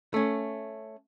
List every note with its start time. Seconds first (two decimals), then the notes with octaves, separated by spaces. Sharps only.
0.14 A3 C#4